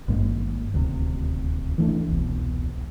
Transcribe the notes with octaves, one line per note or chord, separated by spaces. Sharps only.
G#1 G2 G#3 A#3
D#1 D2 C3
E3 A3 D4
E1 C2 B2